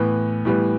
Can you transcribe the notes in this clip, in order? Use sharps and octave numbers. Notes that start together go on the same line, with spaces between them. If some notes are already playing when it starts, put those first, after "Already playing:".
Already playing: A2 E3 B3
A2 E3 G3 B3